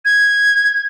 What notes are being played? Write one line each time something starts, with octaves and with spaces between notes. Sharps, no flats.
G#6